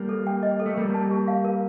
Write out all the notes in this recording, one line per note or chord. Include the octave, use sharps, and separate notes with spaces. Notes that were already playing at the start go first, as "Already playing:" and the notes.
Already playing: G3 A#3
A4
G5
D#5
A4
A3
G3 A#3 A#4
A5
G4
F5
A#4